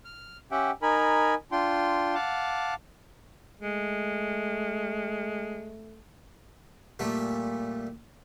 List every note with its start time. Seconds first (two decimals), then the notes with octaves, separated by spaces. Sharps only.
0.05 F6
0.52 C#4 G4 E5 F#5 G5
0.82 D#4 A#4 G#5 B5
1.52 D4 F4 G5 C6
2.15 F5 F#5 A5 D6
3.61 G#3 A3
6.99 A#2 G3 A3